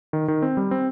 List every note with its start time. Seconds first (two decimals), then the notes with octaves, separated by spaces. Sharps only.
0.13 D#3
0.28 D#3
0.42 C4
0.57 G3
0.71 C4